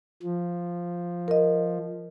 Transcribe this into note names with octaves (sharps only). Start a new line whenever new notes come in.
F3
A#4 D#5